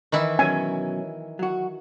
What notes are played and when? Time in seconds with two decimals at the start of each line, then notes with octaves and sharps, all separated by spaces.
0.12 D#3 E3 E4
0.39 B2 F#3 C#4 G#5
1.39 F#3 F#4